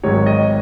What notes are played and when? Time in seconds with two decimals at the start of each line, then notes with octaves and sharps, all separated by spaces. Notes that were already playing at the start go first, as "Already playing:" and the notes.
0.03 G#1 G#2 D#3 F#3 C#5
0.26 D#5